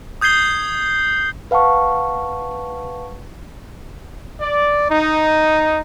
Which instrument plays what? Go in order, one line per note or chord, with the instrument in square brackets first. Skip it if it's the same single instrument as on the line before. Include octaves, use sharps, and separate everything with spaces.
[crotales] D#6 G6 G#6 C7 G7
[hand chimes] B4 F5 F#5 A5 C#6
[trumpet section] D5
D#4